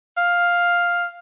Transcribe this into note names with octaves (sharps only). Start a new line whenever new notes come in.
F5